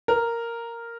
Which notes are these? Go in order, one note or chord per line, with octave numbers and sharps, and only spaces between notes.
A#4